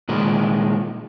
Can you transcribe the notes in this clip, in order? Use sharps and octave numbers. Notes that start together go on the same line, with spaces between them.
A#2 D#3 G#3